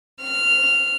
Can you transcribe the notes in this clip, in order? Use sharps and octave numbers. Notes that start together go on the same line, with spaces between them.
F6